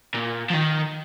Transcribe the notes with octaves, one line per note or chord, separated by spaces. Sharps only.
A#2
F3
D#3